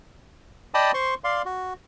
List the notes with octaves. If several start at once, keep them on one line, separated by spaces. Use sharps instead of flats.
D5 D#5 G5 A5 B5 D#6
C5 C6 C#6
D5 F5 C6
F#4